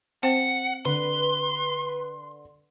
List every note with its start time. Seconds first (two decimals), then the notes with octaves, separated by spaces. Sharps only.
0.23 C4 C5 F#5 G5
0.85 D3 B4 C6